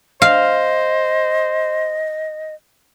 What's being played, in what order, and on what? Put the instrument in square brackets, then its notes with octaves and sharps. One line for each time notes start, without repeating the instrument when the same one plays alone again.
[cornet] C5 [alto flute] D#5 [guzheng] F5